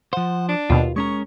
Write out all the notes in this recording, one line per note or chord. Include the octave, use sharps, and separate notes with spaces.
F3 C5 F#5
D4
D#2 B2 F4
G#3 C#4 A#4 C#6